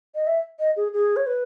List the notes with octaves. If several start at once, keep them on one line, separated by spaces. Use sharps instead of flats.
D#5
E5
D#5
G#4
G#4
C#5
B4